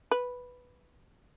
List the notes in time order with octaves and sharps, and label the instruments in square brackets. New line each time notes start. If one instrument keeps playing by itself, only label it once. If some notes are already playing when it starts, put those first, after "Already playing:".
[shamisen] B4